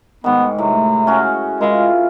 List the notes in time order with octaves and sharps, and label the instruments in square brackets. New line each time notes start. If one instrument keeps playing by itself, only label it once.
[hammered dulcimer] G#2 D#3 [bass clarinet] B3
[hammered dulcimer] A2 [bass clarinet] C3
[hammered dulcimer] C#4 F#4 G#4
[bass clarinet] G#3 [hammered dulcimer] E4 F4 A#4